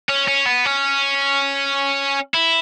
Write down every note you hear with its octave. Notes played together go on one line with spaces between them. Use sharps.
C#4
C#4
B3
C#4
E4